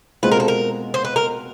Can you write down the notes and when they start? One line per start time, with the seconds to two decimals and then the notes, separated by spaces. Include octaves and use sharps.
0.23 B2 G#3 C4 F4 B4
0.31 A#4
0.40 A4
0.48 A#4
0.94 C5
1.05 B4
1.16 A#4